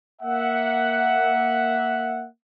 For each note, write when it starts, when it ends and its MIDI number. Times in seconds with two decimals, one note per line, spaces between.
0.22 2.27 58
0.22 2.27 76
0.22 2.27 78